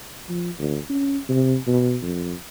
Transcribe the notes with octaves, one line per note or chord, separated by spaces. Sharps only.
F3
D2
C#4
C3
B2
F2